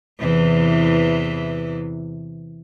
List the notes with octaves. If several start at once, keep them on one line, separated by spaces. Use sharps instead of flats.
E2 C3 E3